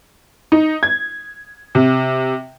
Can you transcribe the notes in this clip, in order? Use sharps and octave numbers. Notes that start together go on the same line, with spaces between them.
D#4
G#6
C3